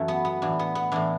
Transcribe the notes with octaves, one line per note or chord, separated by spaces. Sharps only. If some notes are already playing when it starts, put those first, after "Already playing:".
Already playing: F#2 E3 A3
B3
B3
A2 E3 D4
B3
B3
A2 E3 D4